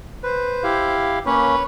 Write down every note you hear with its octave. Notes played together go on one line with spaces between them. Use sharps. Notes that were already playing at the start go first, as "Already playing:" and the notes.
B4 C5
E4 G4 F5
A#3 C#4 B4 C#5